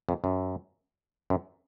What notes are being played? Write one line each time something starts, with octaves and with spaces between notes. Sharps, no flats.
F2
F#2
F#2